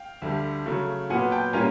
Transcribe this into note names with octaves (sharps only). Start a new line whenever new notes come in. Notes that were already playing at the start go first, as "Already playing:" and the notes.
Already playing: F5 G5
D2 D3 G3
C#3 F#3 A3
A#2 F#3 B3 F#5 G#5
G5 A5
A#2 G3 A#3 C#4 F4 G#5 A#5